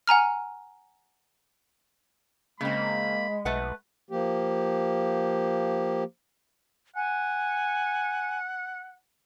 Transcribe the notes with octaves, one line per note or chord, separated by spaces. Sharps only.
F#5 G#5 A#5 F6
C#3 G#3 A#3 C4 B5
B1 A3 B4 F#5
F3 A#3 G4
F#5 G#5